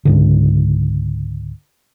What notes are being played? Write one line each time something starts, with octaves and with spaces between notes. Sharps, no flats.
C#2 G#2 D3